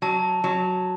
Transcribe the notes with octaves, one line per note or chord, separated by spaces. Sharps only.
F#3 A5
F#3